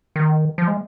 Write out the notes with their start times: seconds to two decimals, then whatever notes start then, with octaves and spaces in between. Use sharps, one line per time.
0.16 D#3
0.58 F3
0.67 G#3